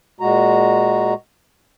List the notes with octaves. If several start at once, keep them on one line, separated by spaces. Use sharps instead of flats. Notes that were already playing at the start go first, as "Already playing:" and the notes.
A#2 G#3 F#4 A#5